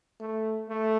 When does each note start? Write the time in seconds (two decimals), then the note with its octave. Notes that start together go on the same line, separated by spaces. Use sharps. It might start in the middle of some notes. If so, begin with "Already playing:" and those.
0.20 A3
0.69 A3